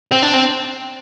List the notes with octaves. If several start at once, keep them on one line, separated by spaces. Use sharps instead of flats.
C4
D4
C4